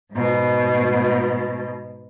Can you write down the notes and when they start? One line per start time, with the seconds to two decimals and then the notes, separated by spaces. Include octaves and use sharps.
0.11 G#2 B2